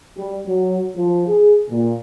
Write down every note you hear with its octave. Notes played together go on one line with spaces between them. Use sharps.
G3
F#3
F3
G#4
A#2